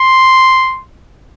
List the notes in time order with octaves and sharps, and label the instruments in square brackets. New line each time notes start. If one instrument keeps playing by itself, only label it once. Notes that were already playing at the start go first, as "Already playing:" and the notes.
Already playing: [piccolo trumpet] C6